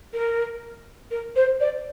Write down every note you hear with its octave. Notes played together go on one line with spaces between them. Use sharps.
A#4
A#4
C5
D5